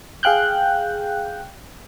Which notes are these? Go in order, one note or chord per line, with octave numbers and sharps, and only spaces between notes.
G#4 F5 G5 F#6 G6